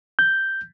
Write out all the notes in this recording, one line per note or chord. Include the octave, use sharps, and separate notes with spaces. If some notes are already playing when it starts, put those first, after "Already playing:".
G6